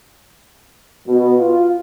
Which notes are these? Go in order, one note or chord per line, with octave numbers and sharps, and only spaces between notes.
B2
F4